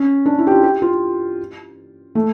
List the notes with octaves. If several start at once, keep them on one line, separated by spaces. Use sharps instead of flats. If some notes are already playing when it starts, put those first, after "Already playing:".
Already playing: C#4
D4
E4
G4
F4
G4
F4
A3